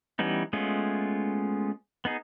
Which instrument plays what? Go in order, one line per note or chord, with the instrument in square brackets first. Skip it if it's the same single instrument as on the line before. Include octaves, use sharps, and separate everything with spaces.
[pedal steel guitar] E3 G3 B3 C#4 D#4
G#3 A3 B3 C#4 F4
B3 D#4 G#4